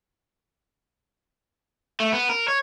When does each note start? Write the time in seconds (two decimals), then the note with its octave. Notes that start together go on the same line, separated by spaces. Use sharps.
2.00 A3
2.12 B3
2.29 A#4
2.48 C#5